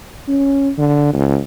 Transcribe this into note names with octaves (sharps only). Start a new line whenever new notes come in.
C#4
D3
C#2